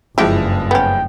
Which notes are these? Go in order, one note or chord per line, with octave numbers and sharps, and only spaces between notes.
F#1 G2 F3 G3 G#3 E4 G4
B3 C#4 G5